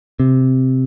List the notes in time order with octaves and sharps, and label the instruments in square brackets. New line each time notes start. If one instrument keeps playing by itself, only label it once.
[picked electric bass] C3